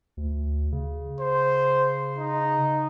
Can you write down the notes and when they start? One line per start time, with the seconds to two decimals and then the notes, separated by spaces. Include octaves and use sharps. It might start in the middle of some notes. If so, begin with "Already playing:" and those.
0.17 D2
0.72 C#3
1.20 C5
2.18 D#4